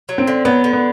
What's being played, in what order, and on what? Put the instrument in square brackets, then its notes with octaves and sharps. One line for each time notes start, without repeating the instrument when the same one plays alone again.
[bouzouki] F#3
[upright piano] C4
[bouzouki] D3
[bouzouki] F#3 [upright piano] B3
[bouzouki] D3
[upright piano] B3